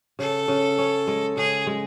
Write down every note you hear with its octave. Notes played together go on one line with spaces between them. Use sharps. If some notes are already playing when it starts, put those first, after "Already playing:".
C#3 A4
C#3
C#4
G#3
C#3 G#4
G#3